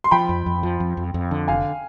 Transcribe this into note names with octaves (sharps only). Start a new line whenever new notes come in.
C6
F3 G5 B5
F2
F2
F3
F2
F2
F2
D3
F1 F5 G#5